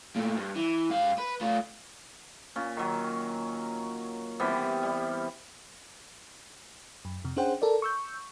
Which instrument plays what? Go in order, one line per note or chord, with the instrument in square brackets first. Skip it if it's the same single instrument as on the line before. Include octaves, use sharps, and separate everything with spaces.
[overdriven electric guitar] A#2 A3
G2
E3
G#2 F5
B4
A3 F4
[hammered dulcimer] A#2 C#4
D#3 F#3
C3 E3 G3 B3
G3
[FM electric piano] F#2
F2 C3
C#4 D4 G#4 C5 F#5 G5
A4 A#4 D5
C#6 E6 G6